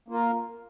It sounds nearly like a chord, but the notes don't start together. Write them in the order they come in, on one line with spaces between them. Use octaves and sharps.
A#3 F4 A#4